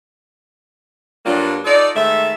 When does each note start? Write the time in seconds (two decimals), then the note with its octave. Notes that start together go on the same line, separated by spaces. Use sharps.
1.25 G2 F#3 G3 A#3 D4 F4
1.65 D#4 F4 A4 D5
1.96 G#2 D#3 A3 E5